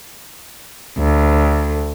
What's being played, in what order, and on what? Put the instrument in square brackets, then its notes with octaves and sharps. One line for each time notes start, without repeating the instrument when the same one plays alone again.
[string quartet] D2